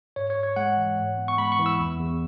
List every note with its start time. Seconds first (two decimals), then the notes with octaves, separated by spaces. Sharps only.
0.16 G#2 C#5
0.30 C#5
0.36 G#2
0.43 C#5
0.56 G#3 F#5
0.77 E3
0.98 G#2
1.18 B3
1.28 C#6
1.38 G#3 B5
1.52 C#6
1.59 E3
1.66 E6
1.79 E2
2.00 E2